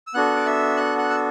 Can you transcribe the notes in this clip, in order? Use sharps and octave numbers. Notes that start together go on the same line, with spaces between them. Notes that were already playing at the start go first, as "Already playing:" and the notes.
E6
B3 D4 F#4 A4 F#5 F#6
D6
E5 E6
F#5 F#6
F#5 F#6
E6